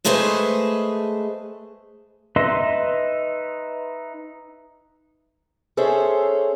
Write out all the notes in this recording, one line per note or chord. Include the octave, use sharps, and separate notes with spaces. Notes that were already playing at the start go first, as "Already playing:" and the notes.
G#3 A3 G#4 B4 C5 D#5
D#4 B4 D#5 E5 C6
C#4 G#4 A4 C5 C#5 E5